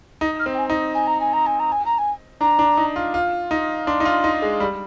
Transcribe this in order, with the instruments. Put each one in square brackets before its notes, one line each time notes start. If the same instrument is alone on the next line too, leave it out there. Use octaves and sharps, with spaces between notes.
[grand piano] D#4
[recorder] F6
[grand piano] C4
[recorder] G5
G#5
[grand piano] D#4
[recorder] G#5
A#5
G#5
A#5
G#5
A#5
G#5
A#5
G#5
[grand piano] D4 [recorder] A#5
[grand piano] D4
D#4
F4
F4
D#4
[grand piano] D4 [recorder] C6
[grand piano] D#4
F4
D#4
G#3
G3